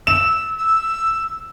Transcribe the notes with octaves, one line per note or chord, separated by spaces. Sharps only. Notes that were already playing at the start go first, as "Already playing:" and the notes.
E6 E7
E6